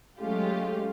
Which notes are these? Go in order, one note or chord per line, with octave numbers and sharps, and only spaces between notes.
F#3 G#3 A3 C#4 F4 G4